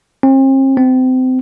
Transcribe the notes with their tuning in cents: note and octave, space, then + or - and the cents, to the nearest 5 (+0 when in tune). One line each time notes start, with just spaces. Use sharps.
C4 +40
C4 -30